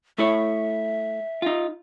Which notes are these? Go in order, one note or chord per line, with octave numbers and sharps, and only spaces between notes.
A3 E4 C#5 E5
D#4 F4